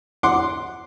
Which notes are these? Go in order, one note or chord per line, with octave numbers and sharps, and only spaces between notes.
F#5 C6 D6